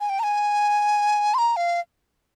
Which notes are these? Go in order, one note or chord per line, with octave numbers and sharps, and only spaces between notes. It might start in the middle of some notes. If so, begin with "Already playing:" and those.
G#5
G5
A#5
G#5
C6
A#5
F5